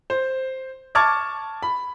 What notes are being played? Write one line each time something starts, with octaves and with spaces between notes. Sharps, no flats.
C5
A5 C#6 D6 F6 G#6 A6
B5